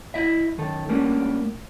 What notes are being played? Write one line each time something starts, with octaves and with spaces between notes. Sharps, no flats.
E4 D#5 E5
F#2 D#3 A4
G3 A3 A#3 C#4 D4